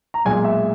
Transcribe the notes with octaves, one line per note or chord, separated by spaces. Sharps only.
A#5
B1 A#2 G#3 G#5
E5